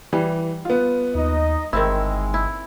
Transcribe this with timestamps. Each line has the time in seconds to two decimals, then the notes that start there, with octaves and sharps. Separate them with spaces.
0.13 E3 G3
0.65 B3 F4
1.15 D#2 D#4 D#5
1.73 G1 D#3 G#3 C4 E4 E6
2.34 E4